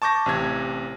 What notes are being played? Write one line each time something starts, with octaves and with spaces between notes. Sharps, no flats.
A5 C#6 D6 G6 A#6
A1 C3 G#6